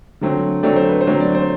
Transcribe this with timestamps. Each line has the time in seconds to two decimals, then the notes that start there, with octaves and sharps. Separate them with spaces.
0.21 D3 F#3 A3 C4
0.63 D3 F#3 A3 C4 D5
0.76 C5
0.89 B4
1.01 C5
1.06 D3 F#3 A3 C4
1.20 D5
1.35 C5